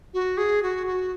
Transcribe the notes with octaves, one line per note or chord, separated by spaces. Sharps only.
F#4
G#4
F#4
F#4